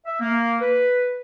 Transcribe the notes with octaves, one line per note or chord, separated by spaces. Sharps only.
E5
A#3
B4